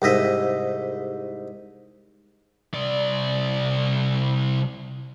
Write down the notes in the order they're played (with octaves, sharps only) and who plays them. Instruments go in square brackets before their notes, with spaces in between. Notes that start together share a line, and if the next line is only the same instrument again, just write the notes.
[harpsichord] C2 G#2 D#5 E5
[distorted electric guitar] C2 D5